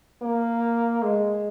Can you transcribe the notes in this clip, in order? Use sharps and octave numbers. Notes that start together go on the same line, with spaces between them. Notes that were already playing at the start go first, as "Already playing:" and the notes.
A#3
G#3